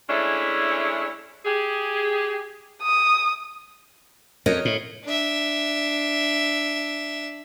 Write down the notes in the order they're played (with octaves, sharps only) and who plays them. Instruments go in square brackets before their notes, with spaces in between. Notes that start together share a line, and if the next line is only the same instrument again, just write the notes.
[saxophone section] G#3 A3 C#4 D4 E4
G4 G#4
[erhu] D#6
[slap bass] F2 [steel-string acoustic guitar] A#4 C#5 D#5
[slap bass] A2
[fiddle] D4 E5